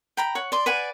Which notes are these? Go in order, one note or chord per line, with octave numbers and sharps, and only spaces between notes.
G5 A#5 B5
C#5 F#5
D5 C6
B4 D5 F#5 G#5